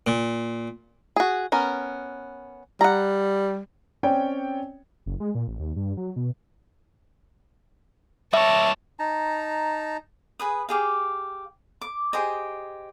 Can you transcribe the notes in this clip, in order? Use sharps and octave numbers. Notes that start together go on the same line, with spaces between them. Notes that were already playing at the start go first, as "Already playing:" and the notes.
A#2
F#4 G#4
B3 C#4 A#4
G3 F#5 A#5
C4 C#4 C#5 D5 G5
F#1
G#3
A#2
A1
D#2
G2
F#3
B2
G3 C#5 E5 A5
D#4 A5 A#5
G#4 B4 D#6
G4 G#4 F5
D6
G4 G#4 C5 D#5